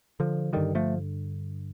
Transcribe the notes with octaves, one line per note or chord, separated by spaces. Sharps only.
D3 F3
G2 D3 D#3 G3
F3 A3